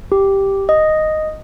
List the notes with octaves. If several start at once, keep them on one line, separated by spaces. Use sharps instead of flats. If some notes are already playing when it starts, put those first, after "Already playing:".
G4
D#5